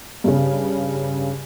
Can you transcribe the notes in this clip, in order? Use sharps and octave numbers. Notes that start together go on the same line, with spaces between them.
G2 C#3